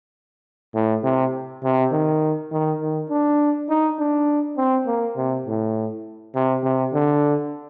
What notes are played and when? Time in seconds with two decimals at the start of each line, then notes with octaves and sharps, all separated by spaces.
0.75 A2
1.04 C3
1.64 C3
1.92 D#3
2.52 D#3
2.82 D#3
3.10 D4
3.69 D#4
3.99 D4
4.57 C4
4.87 A#3
5.17 C3
5.46 A2
6.35 C3
6.64 C3
6.93 D3